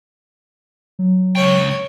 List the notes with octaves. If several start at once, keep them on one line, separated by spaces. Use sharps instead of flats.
F#3
C#2 C#5 G5